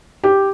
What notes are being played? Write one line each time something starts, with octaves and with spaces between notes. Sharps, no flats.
G4